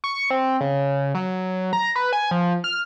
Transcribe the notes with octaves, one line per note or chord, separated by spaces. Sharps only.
C#6
C4
C#3
F#3
A#5
B4
G#5
F3
F6